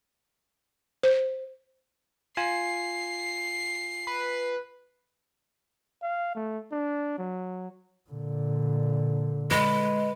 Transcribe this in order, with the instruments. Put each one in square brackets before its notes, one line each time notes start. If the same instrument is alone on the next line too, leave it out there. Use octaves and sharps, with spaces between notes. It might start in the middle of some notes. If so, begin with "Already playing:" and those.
[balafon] C5
[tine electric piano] F4 G#5 [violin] C7
[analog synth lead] B4
[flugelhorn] F5
A3
D4
F#3
[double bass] A#2 D3
[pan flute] G#3 [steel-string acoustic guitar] B4